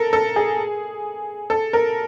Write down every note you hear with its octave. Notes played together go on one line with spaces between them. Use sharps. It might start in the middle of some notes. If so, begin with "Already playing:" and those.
Already playing: A4 A#4
A4
G#4
A4
A#4